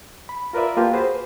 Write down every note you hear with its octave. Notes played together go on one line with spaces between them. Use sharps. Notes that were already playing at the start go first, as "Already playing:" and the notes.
B5
F4 A#4 B4 D5 E5
A#3 F4 G4 A5
F#4 G#4 B4 C5